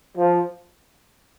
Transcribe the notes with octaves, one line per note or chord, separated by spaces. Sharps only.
F3